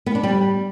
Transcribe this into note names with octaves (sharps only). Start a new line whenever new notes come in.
B3
D4
G3